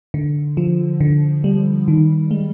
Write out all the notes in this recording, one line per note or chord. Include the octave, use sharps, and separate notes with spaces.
D3
F3
D3
G3
D#3
G#3